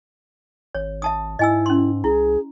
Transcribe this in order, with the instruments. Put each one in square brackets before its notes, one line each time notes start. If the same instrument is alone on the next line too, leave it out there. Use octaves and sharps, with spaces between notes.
[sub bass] G#1 [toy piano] C#5
[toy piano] E5 A5 D#6
[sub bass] G#2 [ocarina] E4 [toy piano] D#5 G#5 E6
[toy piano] C#4 C6
[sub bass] C2 [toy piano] E4 [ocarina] G#4